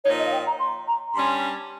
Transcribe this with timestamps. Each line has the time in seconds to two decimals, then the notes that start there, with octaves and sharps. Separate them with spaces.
0.04 A#2 F3 A#3 D#4 C#5
0.19 D#5
0.26 F5
0.33 G5
0.47 A#5
0.59 C6
0.88 A#5
1.14 G2 G3 C#4 C6